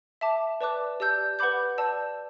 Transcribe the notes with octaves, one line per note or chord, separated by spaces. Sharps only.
E5 A5 D6
B4 D5 A5 D6 F#6
G4 D5 A5 E6 G6
B4 F#5 B5 D6 G6
D5 A5 E6 G6